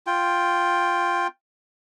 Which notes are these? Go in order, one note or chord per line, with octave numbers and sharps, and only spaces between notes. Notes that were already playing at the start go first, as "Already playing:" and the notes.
F4 G5